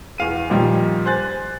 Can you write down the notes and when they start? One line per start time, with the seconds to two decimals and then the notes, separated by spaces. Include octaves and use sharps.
0.18 E2 F5 D#7
0.50 A#2 D#3 F3 G3
1.05 C5 G#5 F#6 A6